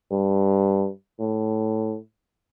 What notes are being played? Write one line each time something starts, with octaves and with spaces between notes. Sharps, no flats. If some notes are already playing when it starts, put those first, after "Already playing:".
G2
A2